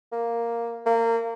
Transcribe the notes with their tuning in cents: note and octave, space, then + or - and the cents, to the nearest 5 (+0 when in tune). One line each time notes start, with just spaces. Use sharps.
A#3 +0
A#3 -25